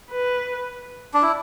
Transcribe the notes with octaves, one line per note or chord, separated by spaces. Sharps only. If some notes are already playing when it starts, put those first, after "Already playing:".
B4
D4
E4